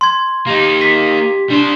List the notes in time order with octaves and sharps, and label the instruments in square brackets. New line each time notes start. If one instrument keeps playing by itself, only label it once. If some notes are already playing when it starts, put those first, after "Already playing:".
[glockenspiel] C6 G#6
[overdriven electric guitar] A#3 D#4 [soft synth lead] G4
[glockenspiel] B6
[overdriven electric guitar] G3 C5 [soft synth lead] D4